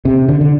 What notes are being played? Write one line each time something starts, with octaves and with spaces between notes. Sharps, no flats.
C3
D3
D3